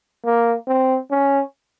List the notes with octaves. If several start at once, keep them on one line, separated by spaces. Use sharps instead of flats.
A#3
C4
C#4